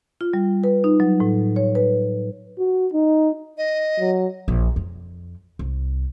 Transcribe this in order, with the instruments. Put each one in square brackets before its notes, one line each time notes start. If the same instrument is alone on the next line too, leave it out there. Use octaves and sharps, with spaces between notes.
[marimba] F4
G3
B4
D#4
F#3
A2
C#5
B4
[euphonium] F#4
D#4
[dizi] D#5
[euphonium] F#3
[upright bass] A#1
F2
C2